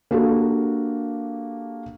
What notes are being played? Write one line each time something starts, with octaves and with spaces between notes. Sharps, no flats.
A#3 D4 F#4 G4 A4